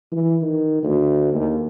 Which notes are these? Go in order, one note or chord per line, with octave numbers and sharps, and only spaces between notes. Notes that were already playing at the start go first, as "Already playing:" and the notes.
E3
D#3
D2
D#2